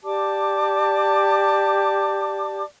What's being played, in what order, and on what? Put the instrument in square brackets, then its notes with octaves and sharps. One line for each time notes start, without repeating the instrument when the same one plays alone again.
[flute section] G4 D5 A5 D6